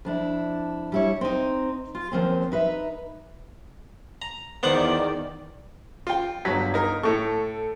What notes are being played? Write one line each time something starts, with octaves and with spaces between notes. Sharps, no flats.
F2 D4 E4
G3 E4 C#5
C4 D#4
F4
D#2 F3 C4 C#4
D#4 B4 E5
A#5
E2 D#3 B3 C5 D5 F#5
F4 G5
G1 F#3 B6
D#4 A#4
A2 A4 C#6